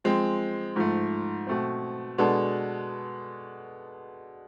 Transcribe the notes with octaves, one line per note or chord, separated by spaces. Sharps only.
F3 G#3 C4
G#2 F3 A3
B2 A3 C4
B2 G#3 B3 D4 A4